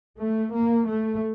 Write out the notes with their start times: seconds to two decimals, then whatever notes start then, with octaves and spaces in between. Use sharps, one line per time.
0.18 A3
0.53 A#3
0.87 A3